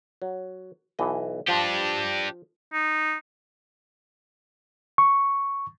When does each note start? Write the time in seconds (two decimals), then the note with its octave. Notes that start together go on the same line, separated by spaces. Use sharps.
0.22 F#3
0.99 B1 E3 D#5
1.48 F3 D4 G4
2.73 D#4
4.98 C#6